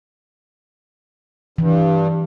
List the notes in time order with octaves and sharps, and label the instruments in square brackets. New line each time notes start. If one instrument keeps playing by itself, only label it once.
[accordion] G2 [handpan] E3